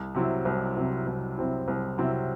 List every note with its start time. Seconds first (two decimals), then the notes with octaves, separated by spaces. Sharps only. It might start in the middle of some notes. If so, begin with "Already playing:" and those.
Already playing: C2
0.15 C3 F#3 C4 E4
0.45 C2
0.77 C3 F#3 C4 E4
1.07 C2
1.37 C3 F#3 C4 E4
1.68 C2
1.98 C3 F#3 C4 E4